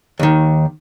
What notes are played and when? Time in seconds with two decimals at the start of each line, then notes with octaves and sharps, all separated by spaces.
0.19 D#2 D#3